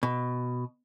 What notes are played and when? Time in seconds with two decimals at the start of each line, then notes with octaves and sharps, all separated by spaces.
0.03 B2